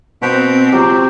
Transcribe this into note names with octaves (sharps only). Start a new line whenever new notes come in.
B2 C4 F#4 C5 F#5
C#2 F#3 G4